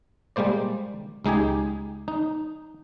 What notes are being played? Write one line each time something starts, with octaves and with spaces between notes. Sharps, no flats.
G3 G#3 A#3 C5 D5
C#2 G#3 D#4 G4 G#5
D#4